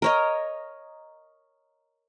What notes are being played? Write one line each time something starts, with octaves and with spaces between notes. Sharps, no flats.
A#4 C#5 D#5